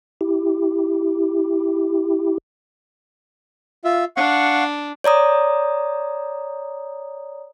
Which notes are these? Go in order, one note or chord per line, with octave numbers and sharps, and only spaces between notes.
E4 G4
F4 E5
D4 F5 F#5 C#6
C#5 D5 A#5 D#6